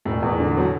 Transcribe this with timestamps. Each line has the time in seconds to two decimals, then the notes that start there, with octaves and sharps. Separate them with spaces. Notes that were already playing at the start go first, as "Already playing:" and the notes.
0.05 E1 A2
0.22 E2
0.40 D3
0.57 B2 F#3